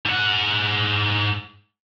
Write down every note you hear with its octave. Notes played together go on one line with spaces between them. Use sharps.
G#2 F#5